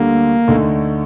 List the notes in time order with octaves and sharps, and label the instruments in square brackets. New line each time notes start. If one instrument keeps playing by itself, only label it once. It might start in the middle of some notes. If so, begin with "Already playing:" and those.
Already playing: [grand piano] D2 D3 G3 D4 [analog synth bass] A#3
[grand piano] D2 D3 A3 D#4